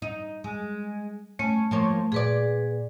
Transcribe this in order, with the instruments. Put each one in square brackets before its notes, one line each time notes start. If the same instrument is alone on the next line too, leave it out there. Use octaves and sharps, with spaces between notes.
[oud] D#4
G#3
[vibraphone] A3 [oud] C#4
[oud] F3 A#3 C#5
[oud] A#2 D5 [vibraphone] G#4 B4